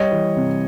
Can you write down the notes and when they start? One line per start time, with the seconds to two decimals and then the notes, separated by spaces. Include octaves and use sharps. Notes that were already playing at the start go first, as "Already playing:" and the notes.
Already playing: G3 C#5 D#5
0.12 E3
0.37 C3